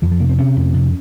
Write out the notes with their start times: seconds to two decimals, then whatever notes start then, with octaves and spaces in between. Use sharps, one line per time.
0.02 F2 E3
0.12 F3
0.20 C3 A#3
0.29 C4
0.38 C3 C#4
0.56 F2
0.74 C3